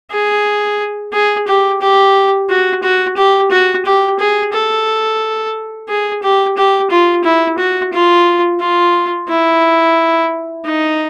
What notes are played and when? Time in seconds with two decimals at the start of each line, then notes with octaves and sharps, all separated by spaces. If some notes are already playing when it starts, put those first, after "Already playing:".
0.11 G#4
1.13 G#4
1.47 G4
1.81 G4
2.49 F#4
2.83 F#4
3.16 G4
3.51 F#4
3.85 G4
4.19 G#4
4.53 A4
5.88 G#4
6.23 G4
6.57 G4
6.90 F4
7.24 E4
7.58 F#4
7.92 F4
8.60 F4
9.29 E4
10.65 D#4